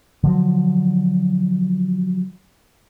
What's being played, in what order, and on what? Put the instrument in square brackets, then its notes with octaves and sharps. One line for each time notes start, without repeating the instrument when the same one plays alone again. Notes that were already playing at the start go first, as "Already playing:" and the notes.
[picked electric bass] D3 F3 F#3